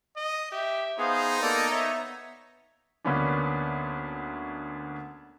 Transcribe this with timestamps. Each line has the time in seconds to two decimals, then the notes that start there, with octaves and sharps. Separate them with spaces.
0.16 D#5
0.52 G4 E5
0.98 B3 D#4 G#4 C5 F5
1.42 A#3 B3 A4 D5 D#5 A#5
1.71 C#5 E5
3.04 D2 A#3 B3 C#4 D4